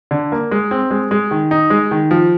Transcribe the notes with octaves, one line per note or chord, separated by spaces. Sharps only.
D3
A#3
G#3
C4
G#3
G#3
D#3
D#4
G#3
D#3
F3